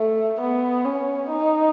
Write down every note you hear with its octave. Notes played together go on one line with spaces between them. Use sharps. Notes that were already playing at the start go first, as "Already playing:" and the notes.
Already playing: A3
B3
C#4
D#4